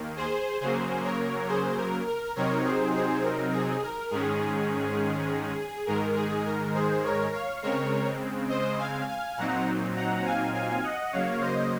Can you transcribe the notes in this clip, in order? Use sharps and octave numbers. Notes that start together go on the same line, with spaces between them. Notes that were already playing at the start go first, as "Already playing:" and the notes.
Already playing: D#2 D#3 A#3
G#4 C5
C#3 F#3 A#3 G#4 C5
A#4 C#5
G#4 C5
A#4
A#4
C3 F#3 C4 D#4 A#4 C#5
G#4 C5
G#4 C5
A#4
G#4
A#4
G#2 D#3 G#3 C#4 G#4
G#2 D#3 G#3 A#4
G#4
A#4
G#4 C5
A#4 C#5
C#5 F5
C#3 G#3 C4 A#4 C#5
C5 D#5
F5 G#5
F5 G#5
A#2 F#3 C4 D#4 F#5 A#5
F#5 A#5
F5 G#5
F5 G#5
D#5 F#5
C#3 F#3 A#3 C#5 F5
C5 D#5